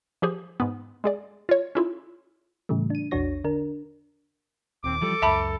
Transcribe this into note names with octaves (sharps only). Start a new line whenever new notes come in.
F3 G4 G#4 C5
G#2 B3
G#3 G#4 D5
F4 C#5
C#4 E4 F4
A2 C#3 E3 G3 A3
D4 D#7
A#1 E2 D4 F#4 C#5 A#6
D3 D4 A#4
D#1 D#2 C4 D6
E3 F3 G3 A4
C#2 F#2 E5 A5 B5